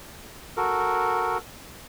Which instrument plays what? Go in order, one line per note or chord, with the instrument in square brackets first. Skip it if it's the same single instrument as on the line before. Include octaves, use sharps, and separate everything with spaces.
[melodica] F#4 A4 A#4